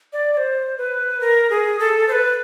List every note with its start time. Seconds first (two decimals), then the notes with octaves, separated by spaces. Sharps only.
0.13 D5
0.33 D5
0.37 C5
0.78 B4
1.21 A#4
1.50 G#4
1.79 A4
2.08 C5
2.12 B4